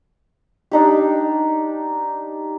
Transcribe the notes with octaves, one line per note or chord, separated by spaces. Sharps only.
D4 D#4 G4